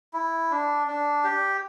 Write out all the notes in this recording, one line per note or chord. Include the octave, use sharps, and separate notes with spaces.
E4
D4
D4
G4